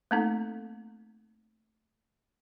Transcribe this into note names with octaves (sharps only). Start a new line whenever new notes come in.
A3 A#3 C4 D#4 A4